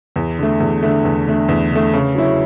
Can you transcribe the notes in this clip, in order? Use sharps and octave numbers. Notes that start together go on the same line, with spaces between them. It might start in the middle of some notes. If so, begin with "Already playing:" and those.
E2
D3 A3
E2
D3 A3
E2
D3 A3
E2
D3 A3
C#3
F#3 C#4 E4